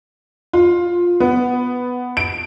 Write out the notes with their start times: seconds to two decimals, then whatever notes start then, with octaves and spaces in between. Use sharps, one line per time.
0.53 F4
1.20 B3
2.17 D7